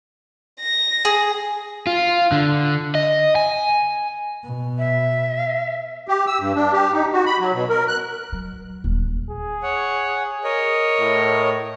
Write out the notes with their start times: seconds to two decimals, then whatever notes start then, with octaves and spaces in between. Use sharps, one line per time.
0.61 A#6
1.05 G#4
1.87 F4
2.32 D3
2.95 D#5
3.36 G#5
4.44 B2
4.78 E5
6.08 G4
6.27 E6
6.40 G2
6.56 D4
6.72 G4
6.93 D#4
7.13 F#4
7.26 B5
7.39 F#3
7.54 B2
7.69 A#4
7.88 F#6
8.32 F#3
8.84 D#1
9.30 G#4
9.63 C#5 F#5
10.44 A#4 C#5 D#5
11.00 A2